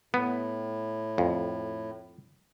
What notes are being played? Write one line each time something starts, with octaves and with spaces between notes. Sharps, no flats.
A2 B3
F2